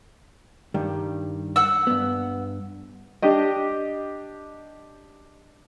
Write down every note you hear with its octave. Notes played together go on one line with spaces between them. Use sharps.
G2 D#3 G3
F#5 E6
G2 B3
D4 G4 D#5